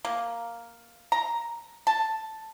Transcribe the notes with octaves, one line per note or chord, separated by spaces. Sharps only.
A#3
A#5
A5